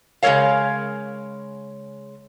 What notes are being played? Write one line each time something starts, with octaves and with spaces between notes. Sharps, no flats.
C#3 G#3 B3 A#4 C#5 F5